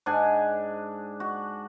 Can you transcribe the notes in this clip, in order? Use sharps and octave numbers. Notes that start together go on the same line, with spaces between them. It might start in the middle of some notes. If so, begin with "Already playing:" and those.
G#2 D4 F#5 G#5
F#4